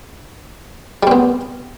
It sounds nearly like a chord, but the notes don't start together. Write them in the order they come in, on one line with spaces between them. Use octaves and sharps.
G3 C4 B3